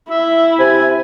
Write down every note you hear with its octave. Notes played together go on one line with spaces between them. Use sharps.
E4 E5
C3 G#5